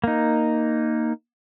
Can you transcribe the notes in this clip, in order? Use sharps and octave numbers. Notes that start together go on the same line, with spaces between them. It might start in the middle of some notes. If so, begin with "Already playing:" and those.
A#3 D#4